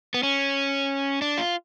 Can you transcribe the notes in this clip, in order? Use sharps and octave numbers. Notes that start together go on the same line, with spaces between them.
B3
C#4
D4
F4